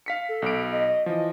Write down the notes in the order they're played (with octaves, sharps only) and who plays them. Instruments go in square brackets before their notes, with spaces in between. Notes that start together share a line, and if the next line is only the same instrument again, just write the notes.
[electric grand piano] F5 B6 C#7
[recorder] A4
[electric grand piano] B1 D7
[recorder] D#5
[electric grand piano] E3 F3 [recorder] D#5